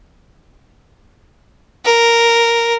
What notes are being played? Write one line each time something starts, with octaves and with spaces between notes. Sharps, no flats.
A#4